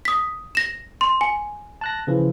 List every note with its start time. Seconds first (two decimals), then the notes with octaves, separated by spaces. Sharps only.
0.05 D#6 B6
0.55 A#6 E7
1.01 C6
1.21 G#5
1.81 A5 F#6 A#6
2.07 C#3 E3 F3